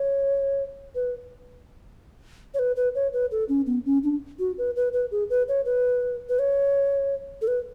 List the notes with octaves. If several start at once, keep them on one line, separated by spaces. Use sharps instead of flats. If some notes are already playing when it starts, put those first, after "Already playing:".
Already playing: C#5
B4
C#5
B4
B4
C#5
B4
A4
C#4
B3
C#4
D4
F#4
B4
B4
B4
G#4
B4
C#5
B4
B4
C#5
A4
B4